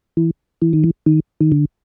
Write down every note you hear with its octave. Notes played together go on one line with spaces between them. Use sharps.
E3
E3
D#3
E3
D#3
D#3
D3